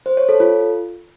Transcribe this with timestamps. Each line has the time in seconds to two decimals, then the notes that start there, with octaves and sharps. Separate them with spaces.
0.06 C5
0.17 C#5
0.29 A4
0.40 F4